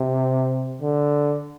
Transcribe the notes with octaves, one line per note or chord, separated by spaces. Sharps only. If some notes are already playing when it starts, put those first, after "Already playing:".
Already playing: C3
D3